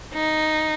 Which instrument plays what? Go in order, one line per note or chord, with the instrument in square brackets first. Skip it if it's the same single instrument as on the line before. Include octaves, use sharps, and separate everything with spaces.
[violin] D#4